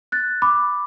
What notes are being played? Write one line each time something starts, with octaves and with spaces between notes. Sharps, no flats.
F#6 A6
B5 D6